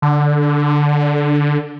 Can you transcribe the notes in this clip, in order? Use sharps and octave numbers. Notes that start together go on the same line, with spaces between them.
D3